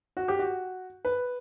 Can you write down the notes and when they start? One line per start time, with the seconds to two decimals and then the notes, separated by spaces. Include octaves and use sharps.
0.17 F#4
0.28 G4
0.39 F#4
1.05 B4